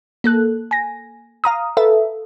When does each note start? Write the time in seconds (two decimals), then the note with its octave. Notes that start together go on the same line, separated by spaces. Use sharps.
0.24 A#3 A4 F#6
0.71 G#5 A#6
1.44 F5 A#5 D#6
1.77 A4 B4 E5